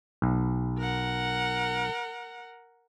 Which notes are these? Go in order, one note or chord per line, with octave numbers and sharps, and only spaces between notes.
B1
A#4 F#5